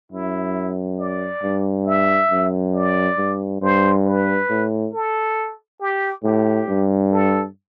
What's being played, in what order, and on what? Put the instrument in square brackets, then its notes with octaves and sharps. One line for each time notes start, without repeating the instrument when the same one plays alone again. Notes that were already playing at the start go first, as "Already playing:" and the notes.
[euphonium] F#2 [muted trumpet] E4
[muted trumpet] D5
[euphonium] G2
[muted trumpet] E5
[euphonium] F#2
[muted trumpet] D5
[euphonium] G2
[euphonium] G2 [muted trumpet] C5
[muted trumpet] B4
[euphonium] A2
[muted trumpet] A4
G4
[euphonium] A2 [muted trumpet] G4
[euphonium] G2
[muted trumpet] A4